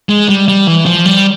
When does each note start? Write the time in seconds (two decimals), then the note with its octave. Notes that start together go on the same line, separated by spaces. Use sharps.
0.09 G#3
0.29 G3
0.48 G3
0.67 E3
0.86 F3
1.05 G3